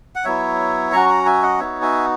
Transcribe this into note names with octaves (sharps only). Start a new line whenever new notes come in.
F#5
F#3 B3 E4 C#5 E5
F#3 C#4 F#4 A#5 C#6
F#5 A#5
E5 G#5
D#5 F#5
B3 D#4 F#4 C#5 E5
E5 G#5